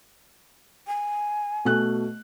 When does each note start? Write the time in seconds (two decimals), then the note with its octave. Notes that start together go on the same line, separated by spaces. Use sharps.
0.87 G#5
1.65 B2 A3 F#6